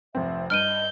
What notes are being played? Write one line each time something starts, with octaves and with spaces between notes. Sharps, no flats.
F1 C4 E5
G2 D#5 F6 G6 D7 D#7